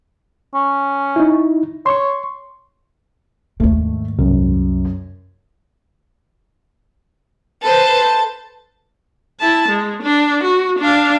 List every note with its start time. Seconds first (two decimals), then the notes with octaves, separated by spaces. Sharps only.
0.54 C#4
1.16 D#4 E4
1.86 C#5 C6 C#6
3.60 D#2 G#2 A3
4.19 C2 F#2
7.62 A4 B4 C5 A5
9.40 E4 A5
9.69 G#3
10.03 D4
10.44 F#4
10.79 D4 F5